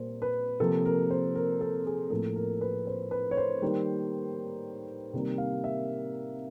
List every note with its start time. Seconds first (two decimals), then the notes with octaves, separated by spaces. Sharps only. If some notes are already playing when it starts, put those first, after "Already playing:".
Already playing: A#2 G3 A#3 C5
0.22 B4
0.60 C3 F3 A#3 A4
0.85 A#4
1.10 C5
1.35 A#4
1.61 A4
1.86 G#4
2.10 A2 F3 A#3 A4
2.36 A#4
2.61 B4
2.87 C5
3.11 B4
3.31 C#5
3.37 C5
3.62 D#3 G3 A#3
5.13 C3 D#3 G3 A#3
5.38 F5
5.64 E5